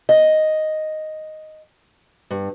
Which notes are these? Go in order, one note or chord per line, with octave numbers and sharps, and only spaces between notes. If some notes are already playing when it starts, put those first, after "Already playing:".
D#5
G2